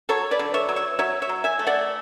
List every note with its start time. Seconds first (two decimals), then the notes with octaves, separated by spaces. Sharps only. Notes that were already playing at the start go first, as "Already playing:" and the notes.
0.09 F#3 A4 C#5
0.31 B4 D5
0.39 D3
0.54 C#5 E5
0.69 F#3
0.76 C#5 E5
0.99 F#3 C#5 E5
1.22 C#5 E5
1.29 F#3
1.44 E5 G#5
1.59 A3
1.67 D5 F#5